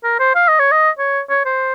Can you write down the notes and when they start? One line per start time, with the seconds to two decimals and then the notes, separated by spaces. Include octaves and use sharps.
0.04 A#4
0.20 C5
0.35 F5
0.48 D#5
0.59 C#5
0.72 D#5
0.98 C#5
1.30 C#5
1.45 C5